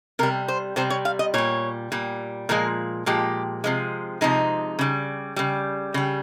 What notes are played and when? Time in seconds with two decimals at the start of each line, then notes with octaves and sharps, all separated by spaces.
0.19 C3 A#4
0.23 G3
0.48 C5
0.76 C3 G3 C5
0.90 C#5
1.05 F5
1.19 D#5
1.34 A#2 G3 C#5
1.92 A#2 G3
2.49 A#2 F3 G#3 A#4
3.06 A#2 F3 G#3 G4
3.64 C3 F3 G#3
4.21 C3 F3 G#3 D#4
4.79 C#3 G3
5.36 C#3 G3
5.94 C#3 G3